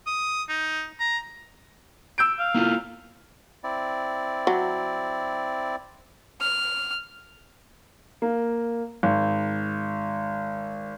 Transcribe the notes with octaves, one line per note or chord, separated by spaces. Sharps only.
D#6
D#4
A#5
E6 G6 D7
F5
A#3 E4 F4
C4 E4 D5
F#3
F6
A#3
G#1